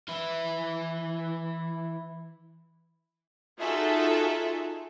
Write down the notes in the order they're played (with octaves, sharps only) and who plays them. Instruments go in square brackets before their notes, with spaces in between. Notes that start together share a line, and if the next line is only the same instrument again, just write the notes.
[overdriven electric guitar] E3 E4
[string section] D#4 F4 F#4 G#4 A4 E5